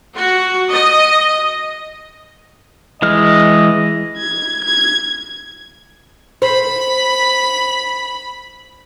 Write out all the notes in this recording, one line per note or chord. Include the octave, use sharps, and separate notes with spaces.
F#4
D#5
E3 G#3 D#5 F6
G#6
G#6
C5 B5